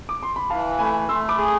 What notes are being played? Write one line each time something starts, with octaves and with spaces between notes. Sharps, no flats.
D6
C6
B5
E3 F5 A5
A3 G#5 B5
A3 C6 E6
B5 D6
G#4